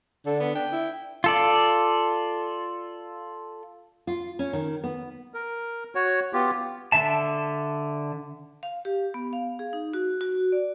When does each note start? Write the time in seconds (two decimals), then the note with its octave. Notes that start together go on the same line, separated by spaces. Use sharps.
0.26 D3 A4
0.40 B3
0.55 D4 G5
0.72 E4
1.24 F4 A4 D5
4.07 F4
4.39 C#4
4.53 D#3
4.84 B3
5.34 A#4
5.95 F#4 C#5
6.33 B3 F4 G4
6.92 D3 E5 A5
8.63 F5
8.85 G4
9.14 B3
9.33 F5
9.59 G#4
9.73 D#4
9.93 F#4
10.21 F#4
10.52 D5